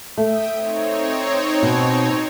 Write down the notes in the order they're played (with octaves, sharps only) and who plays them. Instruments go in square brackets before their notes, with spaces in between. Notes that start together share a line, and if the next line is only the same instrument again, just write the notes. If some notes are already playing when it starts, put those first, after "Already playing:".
[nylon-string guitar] A3 [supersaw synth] E5 G5 D#6
[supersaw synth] C4 D#4 C#5
[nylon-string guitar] B2